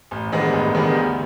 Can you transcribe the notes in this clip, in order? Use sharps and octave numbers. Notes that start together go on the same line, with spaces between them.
A1
G2 D#3 G#3 B3
A1
G2 D#3 G#3 B3
D2